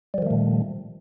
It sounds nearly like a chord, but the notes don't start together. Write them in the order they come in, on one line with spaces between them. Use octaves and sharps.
G3 F3 D#3 A3 A#2